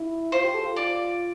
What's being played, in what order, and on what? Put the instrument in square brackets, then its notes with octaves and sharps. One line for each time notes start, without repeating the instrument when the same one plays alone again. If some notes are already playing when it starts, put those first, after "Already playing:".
Already playing: [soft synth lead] E4
[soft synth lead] F4 [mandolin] C5
[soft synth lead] G4
A4
F4
[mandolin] D5